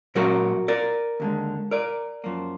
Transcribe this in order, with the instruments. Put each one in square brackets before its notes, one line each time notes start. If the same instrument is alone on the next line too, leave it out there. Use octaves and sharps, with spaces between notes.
[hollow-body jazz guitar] A#2 F#3 A#3 F#4 A#4
A#4 D5
D#2 D3 G#3
A#4 D5
F#2 F3 A#3